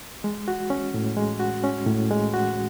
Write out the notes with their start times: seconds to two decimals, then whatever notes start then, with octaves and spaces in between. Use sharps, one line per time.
0.24 G#3
0.48 F#4
0.70 C#4
0.94 A2
1.17 G#3
1.40 F#4
1.64 C#4
1.86 A2
2.11 G#3
2.33 F#4